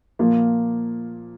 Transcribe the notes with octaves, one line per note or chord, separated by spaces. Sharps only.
A#2 F3 A#3 F4